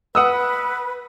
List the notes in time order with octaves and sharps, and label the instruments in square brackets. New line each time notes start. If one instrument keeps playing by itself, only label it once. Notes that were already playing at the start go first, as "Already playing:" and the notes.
[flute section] B4 [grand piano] F#5 D#6 E6